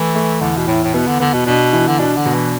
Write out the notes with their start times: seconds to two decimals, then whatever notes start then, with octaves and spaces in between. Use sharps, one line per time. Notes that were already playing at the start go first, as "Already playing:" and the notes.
Already playing: E3 A3
0.15 A3
0.41 E2 D3
0.57 B2
0.68 A2 E4
0.84 A2
0.94 B2 B3
1.08 D3
1.20 D3 B3
1.34 B2
1.47 B2 D4
1.73 E3
1.88 D3
1.99 B2 D4
2.17 D3
2.26 B2
2.34 E3